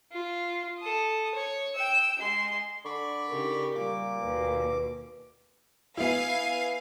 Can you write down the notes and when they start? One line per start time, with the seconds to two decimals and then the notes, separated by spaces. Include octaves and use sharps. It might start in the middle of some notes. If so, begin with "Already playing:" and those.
0.12 F4
0.79 A4 D#6
1.35 C#5
1.75 G5 E6
2.19 G#3 C6
2.85 D3 D5 B5 C#6
3.30 C#3 D#4 G4 A#4
3.75 A#2 G3 D6
4.21 D#2 B2 B4
5.97 B3 E4 F5 G#5